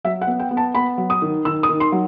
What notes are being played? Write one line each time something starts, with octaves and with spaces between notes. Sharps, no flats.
F#3 E5
F#5
B3
G5
B3
A5
B3 B5
F#3
D#6
D#3
D#3 E6
D#6
D#3
C6
F#3